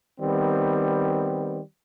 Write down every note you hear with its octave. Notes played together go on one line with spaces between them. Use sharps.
D#3 G3 B3 C4